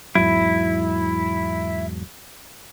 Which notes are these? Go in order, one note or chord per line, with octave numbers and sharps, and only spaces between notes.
E2 G#2 F#3 E4